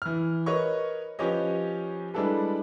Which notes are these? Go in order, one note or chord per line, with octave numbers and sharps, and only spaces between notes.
E3 F6
A#4 B4 C#5 D#5 C#6
F3 C#4 G4 B4 C#5 D#5
G3 G#3 D4 E4 A4 B4